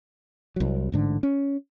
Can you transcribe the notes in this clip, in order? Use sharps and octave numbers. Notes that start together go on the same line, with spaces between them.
C2 F#3
A1 G#2 D3
C#4